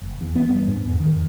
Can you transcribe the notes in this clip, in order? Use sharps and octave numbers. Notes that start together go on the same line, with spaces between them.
F#1
E2
B3
G2
G#2
E2
D#3
F2